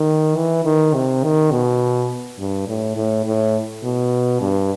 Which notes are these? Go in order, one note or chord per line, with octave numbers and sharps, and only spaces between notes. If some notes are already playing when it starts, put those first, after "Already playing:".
Already playing: D#3
E3
D#3
C3
D#3
B2
G2
A2
A2
A2
B2
G2